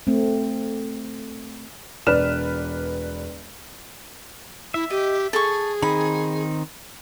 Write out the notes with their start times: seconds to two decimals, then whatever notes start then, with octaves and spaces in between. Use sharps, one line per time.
0.07 A3 C4
2.07 E1 B4 D5 F6 E7
4.74 E4 E5
4.90 G4 D#5
5.33 G#4 A4 C#6
5.82 D#3 C4 D#4 B5